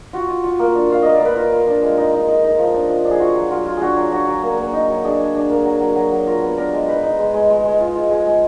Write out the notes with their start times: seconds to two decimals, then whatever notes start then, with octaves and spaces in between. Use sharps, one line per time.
0.13 F4 F#4
0.28 F4
0.44 F4
0.59 A#3
0.75 D4
0.90 F4 F5
1.02 A#3 D#5
1.14 D5
1.21 A#3 B4
1.36 F4 A#4
1.52 F4
1.67 D4
1.82 G#3
1.98 D#4
2.13 D#4
2.28 D#4
2.44 D#4
2.59 F3
2.74 D4
2.90 F3
3.04 D4
3.10 G#4
3.20 F4 F#4
3.35 F#3
3.51 F#3 F4
3.66 F4
3.77 D4 F#4 G#4
3.97 F#3
4.11 D4 F#4
4.27 F#3
4.42 A#3
4.57 A#3
4.73 D#4
4.89 F#3
5.04 D4 G#4
5.20 D4
5.35 D4
5.50 A#3
5.65 F#3
5.80 F#3
5.95 F#3
6.12 F#3
6.27 F4 A#4
6.42 B3
6.57 D4 A#4
6.73 G#3
6.88 D#4 B4
7.03 D#4
7.19 G#3
7.34 G#3
7.50 G#3
7.65 G#3
7.80 F4
7.95 F4
8.11 G#3
8.26 G#3